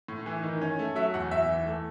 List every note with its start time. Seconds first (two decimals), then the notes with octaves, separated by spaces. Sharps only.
0.08 A2
0.26 E3
0.43 D#3
0.61 C#4
0.79 A3
0.95 F#3 E5
1.14 E2 F#5
1.31 E2 E5
1.49 E3
1.66 A3